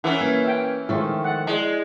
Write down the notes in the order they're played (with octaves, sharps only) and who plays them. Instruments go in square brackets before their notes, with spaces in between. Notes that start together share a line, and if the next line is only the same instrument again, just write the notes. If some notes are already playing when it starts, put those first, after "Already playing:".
[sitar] E3 C#4 [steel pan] E4 A#4 F#5 [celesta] E6 F6
[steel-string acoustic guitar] A#3 [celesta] B4 F6 G#6
[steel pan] E5 G5
[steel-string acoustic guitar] D#3 F3 A3 [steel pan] G#3 E4 [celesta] C#6 F6
[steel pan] E5 F#5 [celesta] F#6 A6
[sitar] G#3 [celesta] E4 D5